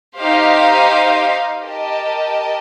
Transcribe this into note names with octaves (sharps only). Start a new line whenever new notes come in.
D#4 G4 C5 F5
G4 A#4 D#5 A5